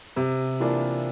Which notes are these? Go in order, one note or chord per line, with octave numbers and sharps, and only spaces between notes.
C3
E3 A#3 D4 F4